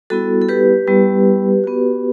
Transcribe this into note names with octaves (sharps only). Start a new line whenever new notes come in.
G3 B3 E4 F#4 A4
A4
G4 B4
G3 B3 E4
B3 F#4